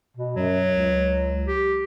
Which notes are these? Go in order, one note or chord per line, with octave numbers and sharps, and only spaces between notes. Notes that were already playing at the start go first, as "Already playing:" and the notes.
B2
F#2 F#3
C#2
G4